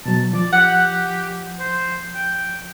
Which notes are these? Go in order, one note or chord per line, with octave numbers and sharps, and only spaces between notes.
B2 F#3 A5
F3 D5
G4 F#5
C5
G5